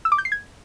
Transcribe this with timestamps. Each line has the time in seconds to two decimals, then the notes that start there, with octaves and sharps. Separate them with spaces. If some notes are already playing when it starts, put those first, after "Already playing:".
0.05 E6
0.12 D6
0.18 G6
0.25 C7
0.32 G#6